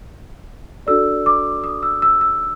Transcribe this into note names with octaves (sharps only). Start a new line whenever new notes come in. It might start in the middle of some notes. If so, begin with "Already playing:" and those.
D4 F#4 A4 D5 E6
D6
D#6
E6
E6
E6